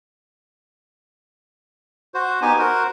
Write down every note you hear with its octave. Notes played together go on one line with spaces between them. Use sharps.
F#4 C5
B3 D#4 G4 G#5
F#4 A#4 C5